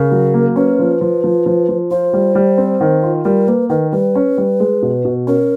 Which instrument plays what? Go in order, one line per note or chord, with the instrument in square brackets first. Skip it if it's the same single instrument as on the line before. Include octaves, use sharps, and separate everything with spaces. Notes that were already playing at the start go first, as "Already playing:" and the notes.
Already playing: [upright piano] C#3 [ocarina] A#4
[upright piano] F#3
A#3
[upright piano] C#4 [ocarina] B4
[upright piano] F3
F3
F3
F3
F3
[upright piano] F4 [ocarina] C5
[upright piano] G3
G3
C4
D#3
F4
[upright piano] G3 [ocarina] A#4
[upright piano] A#3 [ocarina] B4
[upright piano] D#3 [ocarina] B4
[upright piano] G3 [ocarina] B4
[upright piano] C#4
G3
G#3
B2
B2
[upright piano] C#4 [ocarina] A#4